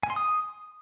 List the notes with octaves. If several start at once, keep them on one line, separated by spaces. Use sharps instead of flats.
G#5
C6
D#6